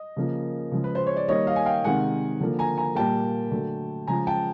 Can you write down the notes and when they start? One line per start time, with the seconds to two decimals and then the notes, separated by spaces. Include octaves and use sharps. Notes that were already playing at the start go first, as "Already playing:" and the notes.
Already playing: D#5
0.17 C#3 F3 A#3
0.72 C#3 F3 G#3
0.84 B4
0.95 C5
1.07 C#5
1.17 D5
1.28 D#3 G3 A#3 C#5 D#5
1.47 D#5 F5
1.56 G#5
1.66 F5 G5
1.84 C3 D#3 G#3 F#5 G#5
2.41 D3 F3 A#3
2.59 G#5 A#5
2.77 G#5 A#5
2.95 A#2 G3 A#3 G5 A5
3.51 D3 F#3 A3
4.08 C#3 F3 G#3 G#5 A#5
4.27 G5 A5